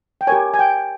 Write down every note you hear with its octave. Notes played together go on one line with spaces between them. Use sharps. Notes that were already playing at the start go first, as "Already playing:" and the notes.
G5
G4 A#4 C#5 G#5
G#5
G5